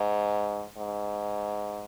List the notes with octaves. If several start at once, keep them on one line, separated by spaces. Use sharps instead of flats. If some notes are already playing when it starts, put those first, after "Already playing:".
Already playing: G#2
G#2